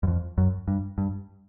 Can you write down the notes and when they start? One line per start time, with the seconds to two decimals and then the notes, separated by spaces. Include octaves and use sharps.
0.03 F#2
0.07 F2
0.38 F#2
0.68 G2
0.98 G2